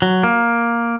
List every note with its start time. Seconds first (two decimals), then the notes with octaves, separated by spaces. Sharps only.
0.02 F#3
0.23 A#3